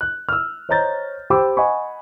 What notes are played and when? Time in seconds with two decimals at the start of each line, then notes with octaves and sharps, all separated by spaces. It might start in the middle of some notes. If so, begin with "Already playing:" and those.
0.01 F#6
0.29 E6 F6
0.69 C5 C#5 D#5 A#5 G6 A6
1.30 G4 C5 G5 B5 D6 E6
1.57 D#5 F#5 G#5 B5 C#6